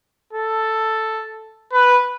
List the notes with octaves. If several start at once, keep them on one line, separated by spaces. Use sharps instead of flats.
A4
B4